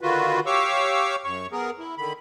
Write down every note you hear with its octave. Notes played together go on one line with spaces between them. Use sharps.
D3 D#3 F4 F#4 B4
G4 C#5 F5 C#6 D6 E6
F#2 C#5 C#6
B3 G#4 A#4
E4
D3 D#3 B5